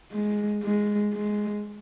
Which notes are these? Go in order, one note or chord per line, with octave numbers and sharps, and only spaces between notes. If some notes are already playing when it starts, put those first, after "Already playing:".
G#3
G#3
G#3